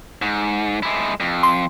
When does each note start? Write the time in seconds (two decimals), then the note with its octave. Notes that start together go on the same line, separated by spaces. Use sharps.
0.22 G#2
0.83 G#3 E4
1.20 F2
1.43 C6